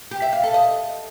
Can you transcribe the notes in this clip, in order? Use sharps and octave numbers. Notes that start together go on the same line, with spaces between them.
G4
E5
F5
A4
D#5